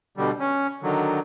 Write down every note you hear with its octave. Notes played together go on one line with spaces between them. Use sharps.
B2 D3 G3
C#4
D3 D#3 F#3